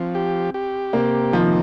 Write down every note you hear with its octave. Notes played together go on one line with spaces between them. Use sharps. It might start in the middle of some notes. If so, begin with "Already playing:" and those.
Already playing: F3 C4
G4
G4
C3 A#3
D#3 F3